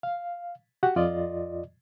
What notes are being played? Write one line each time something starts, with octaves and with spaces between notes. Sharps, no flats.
F5
F#4 G4 F#5
F2 F4 D5 D#5